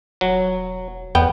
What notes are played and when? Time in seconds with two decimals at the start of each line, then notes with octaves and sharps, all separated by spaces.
0.21 E1 F#3
1.15 E2 B3 G5